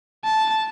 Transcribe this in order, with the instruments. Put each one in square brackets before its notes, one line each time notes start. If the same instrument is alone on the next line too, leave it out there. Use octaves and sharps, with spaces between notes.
[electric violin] A5